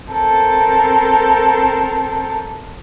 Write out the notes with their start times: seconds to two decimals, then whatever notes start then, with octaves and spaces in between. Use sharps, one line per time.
0.11 C4 A4 A#4